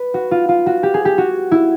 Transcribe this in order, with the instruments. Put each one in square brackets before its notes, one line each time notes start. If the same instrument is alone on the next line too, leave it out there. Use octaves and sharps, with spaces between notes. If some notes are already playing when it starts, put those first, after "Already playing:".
Already playing: [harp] B4
F#4
F4
F4
F#4
G4
G#4
G4
F#4
E4